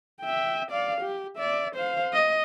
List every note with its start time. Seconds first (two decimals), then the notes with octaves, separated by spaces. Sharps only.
0.21 E5 G5
0.71 D5 F5
1.01 G4
1.36 D5 E5
1.75 C5 F5
2.13 D#5